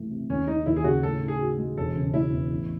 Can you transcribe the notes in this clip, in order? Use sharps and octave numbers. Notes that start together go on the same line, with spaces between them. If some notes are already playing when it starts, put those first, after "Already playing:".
Already playing: C2 E3 A3
C3
D#2 C#4
G#3 D#4
D#2 E4
G#4
C#3 F#4
A2 A4
D#4
G#4
F#4
G#3
E1 A4
C#3
G#3 E4
E2
A1